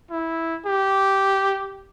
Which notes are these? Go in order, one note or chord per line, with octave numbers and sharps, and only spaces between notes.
E4
G4